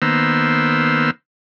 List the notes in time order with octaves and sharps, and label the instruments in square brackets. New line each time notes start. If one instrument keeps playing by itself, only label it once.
[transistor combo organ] D#3 A#3 B3 C5 E6